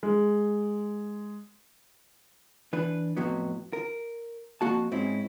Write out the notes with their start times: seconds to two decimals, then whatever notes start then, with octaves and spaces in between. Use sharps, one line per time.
0.03 G#3
2.73 E3 D4 B4
3.17 F2 A2 F#3 B3
3.73 A#4
4.61 F2 A#3 F#4 A5
4.92 G#2 C4 C#4 E4